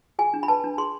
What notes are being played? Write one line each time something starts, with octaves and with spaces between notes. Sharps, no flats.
G#4 G#5
D4
B5
B4 A5
D4
G#4 C6